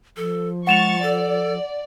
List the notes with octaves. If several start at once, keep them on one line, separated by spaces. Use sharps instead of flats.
F3 A4
G#3 F#5 C#6 A6 E7 F7
A4 D5